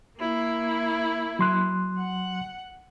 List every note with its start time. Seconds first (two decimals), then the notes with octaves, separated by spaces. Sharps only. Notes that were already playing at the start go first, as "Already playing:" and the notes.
0.18 A#3 E4
1.39 F#3 C6 F#6
1.98 F#5